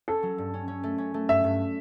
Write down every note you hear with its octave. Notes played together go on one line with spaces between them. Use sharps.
C#4 A4
F#3
G2
C#4
C#4
A3
C#4
A3
G2 E5
G2